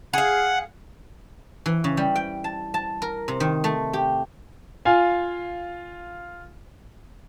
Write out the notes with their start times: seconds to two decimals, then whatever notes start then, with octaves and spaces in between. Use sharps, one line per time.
0.14 G#4 F5 F#5
1.66 E3
1.84 C#3
1.97 G3
2.15 G5
2.44 A5
2.74 A5
3.02 A#4
3.28 C3
3.40 D#3
3.64 A3
3.93 G4
4.85 F4 F5 G#5